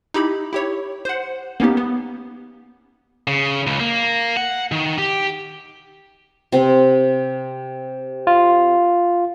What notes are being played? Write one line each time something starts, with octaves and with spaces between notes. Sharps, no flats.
D#4 E4 G4 B5
E4 G4 C#5
C5 F#5
A#3 B3 C#4 D#4 G4
B3
C#3
C#2
A#3
F#5
D#3
G4
C3 C4
F4